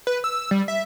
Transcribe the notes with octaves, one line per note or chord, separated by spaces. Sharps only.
B4
E6
G3
E5